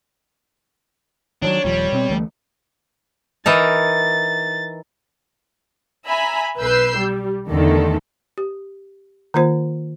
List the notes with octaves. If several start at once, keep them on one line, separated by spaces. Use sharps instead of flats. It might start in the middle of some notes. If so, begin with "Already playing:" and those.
D#3 E3 F#3 D4 C#5
D#1 D#2 F3 G3
B2 C4
D2 E3 A3
E3 D#4 A#4 A6
E5 G#5 A#5 B5
B1 B4 E6 G6 C7
G3
E2 D3 D#3 A3 A4
G4
D#3 A#3 F4 C5